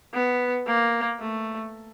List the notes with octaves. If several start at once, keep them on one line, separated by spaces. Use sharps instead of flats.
B3
A#3
A3